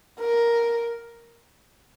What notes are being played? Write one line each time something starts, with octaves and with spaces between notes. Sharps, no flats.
A#4